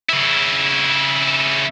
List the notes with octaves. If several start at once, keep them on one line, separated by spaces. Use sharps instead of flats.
C#3 E4